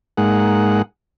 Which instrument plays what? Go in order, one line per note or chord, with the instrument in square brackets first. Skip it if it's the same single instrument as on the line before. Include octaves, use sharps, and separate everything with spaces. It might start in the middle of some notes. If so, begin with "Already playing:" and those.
[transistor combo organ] G#2 G#3 A#3 D#4 F#5